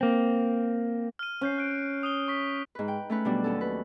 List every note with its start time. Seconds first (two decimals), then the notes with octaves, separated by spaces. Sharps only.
0.01 A#3 C4
1.19 F6 D#7
1.41 C#4 F6 G6 C7
1.58 F#6 D7
2.03 D#6 D#7 G7
2.28 C#6 B6
2.75 G#2 B4
2.88 G5
3.10 A3 C#4 B4
3.25 B2 F#3 G3 D4
3.44 D#2 C#4 A4
3.61 B4